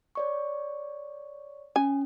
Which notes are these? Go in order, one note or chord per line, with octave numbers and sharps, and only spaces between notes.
C#5 D5 C#6
C#4 G#5